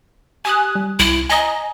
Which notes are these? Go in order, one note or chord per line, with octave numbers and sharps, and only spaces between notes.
G4 G#5 D#6 F#6
G3
C2 E4
D#5 G#5 A#5 D#6